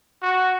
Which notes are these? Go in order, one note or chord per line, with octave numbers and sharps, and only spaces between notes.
F#4